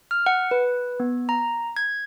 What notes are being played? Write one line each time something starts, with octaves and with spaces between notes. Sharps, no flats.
F6
F#5
B4
B3
A#5
G#6